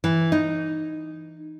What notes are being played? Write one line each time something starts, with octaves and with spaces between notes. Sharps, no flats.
E3
D#4